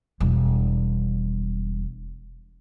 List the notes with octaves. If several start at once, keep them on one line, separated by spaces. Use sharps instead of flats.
E1 G3